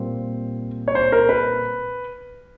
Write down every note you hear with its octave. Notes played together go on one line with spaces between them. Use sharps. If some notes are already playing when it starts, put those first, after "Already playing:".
Already playing: A#2 G3 C4 C5
C#5
C5
A#4
B4